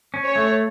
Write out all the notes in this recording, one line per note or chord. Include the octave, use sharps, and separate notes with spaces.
C#4
C#5
A3